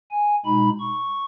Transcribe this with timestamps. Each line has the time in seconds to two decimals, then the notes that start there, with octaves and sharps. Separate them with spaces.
0.11 G#5
0.45 B2 G#3 D#4 B5
0.80 C#6